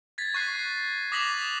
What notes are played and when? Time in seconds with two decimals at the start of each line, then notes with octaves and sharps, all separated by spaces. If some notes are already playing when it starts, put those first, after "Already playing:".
0.18 G#6 A6 B6
0.34 C#6 F#6 C7
0.59 C7
1.12 D6 D#6 A#6 B6 E7 F#7